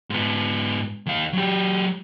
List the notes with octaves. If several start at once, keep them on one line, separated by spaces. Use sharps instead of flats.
G#2 B3
D#2 F5
F#3 G4